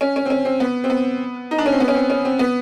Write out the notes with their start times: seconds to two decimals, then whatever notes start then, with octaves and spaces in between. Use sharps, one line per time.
0.01 C#4
0.16 C#4
0.25 C4
0.30 C#4
0.45 C4
0.60 B3
0.84 C4
0.90 B3
1.51 D#4
1.58 D4
1.66 C#4
1.72 C4
1.80 B3
1.88 C#4
1.94 C4
2.10 C#4
2.25 C4
2.39 B3